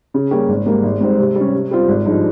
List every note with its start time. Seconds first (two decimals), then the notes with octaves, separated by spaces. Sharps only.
0.14 C#3
0.31 G3 A#3 C#4 G4
0.49 G#1
0.66 G#2 G3 A#3
0.83 G#1
1.01 G#2 G3 C4
1.18 C3
1.35 G3 C#4
1.53 C3
1.71 G3 C4 F4
1.88 G#1
2.05 G2 F3 G#3 D#4